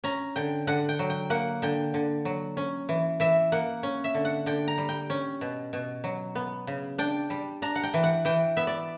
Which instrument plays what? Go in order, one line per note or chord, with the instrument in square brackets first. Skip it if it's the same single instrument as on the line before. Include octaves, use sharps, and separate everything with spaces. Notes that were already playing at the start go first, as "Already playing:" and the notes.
[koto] C#4 A#5
D3 G5
D3 F#5
G5
F#3
G5
A#3 F#5
D3 G5
D3
F#3
C#4
E3
E3 E5
A#3 F#5
C#4
E5
D3
F#5
D3 G5
A#5
G3
G5
C#4
B2
B2
F#3
B3
C#3
D4 G5
G3
D4 A#5
F#5
G5
E3
F#5
E3 G5
B3 E5
D5